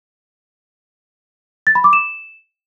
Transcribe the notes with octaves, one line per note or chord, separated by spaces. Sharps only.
A6
B5
D6
E7